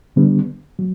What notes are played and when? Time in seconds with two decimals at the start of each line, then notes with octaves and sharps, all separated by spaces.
0.16 D3 G3 B3 D4
0.79 F#3